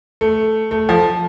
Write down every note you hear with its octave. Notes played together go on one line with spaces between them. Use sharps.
A3
A3
F3